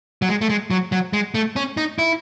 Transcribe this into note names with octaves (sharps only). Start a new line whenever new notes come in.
F#3
G#3
A3
G#3
F#3
F#3
G#3
A3
C#4
D#4
E4